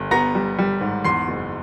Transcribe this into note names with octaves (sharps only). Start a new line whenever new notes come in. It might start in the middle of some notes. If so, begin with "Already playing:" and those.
Already playing: G1
B3 A#5 A#6
G3
G3
G#2
E2 C6 C7
F#1